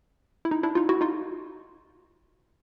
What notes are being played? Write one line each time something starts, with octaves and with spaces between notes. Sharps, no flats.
E4
D#4
D4 E4
D#4 F4
E4 F#4
D#4 F4